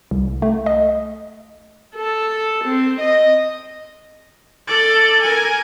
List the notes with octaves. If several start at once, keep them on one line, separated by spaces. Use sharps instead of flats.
C2
A3
D#5
A4
C4
D#5
A4 D5
A#4 G#5